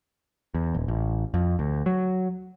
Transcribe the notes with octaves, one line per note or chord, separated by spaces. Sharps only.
E2
D#1
A1
F2
D2
F#3